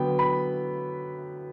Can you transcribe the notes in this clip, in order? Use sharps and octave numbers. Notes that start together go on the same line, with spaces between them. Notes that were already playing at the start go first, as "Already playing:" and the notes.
Already playing: D3 F#3 B3 G5
B5